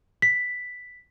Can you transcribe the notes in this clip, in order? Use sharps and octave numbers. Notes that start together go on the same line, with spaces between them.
B6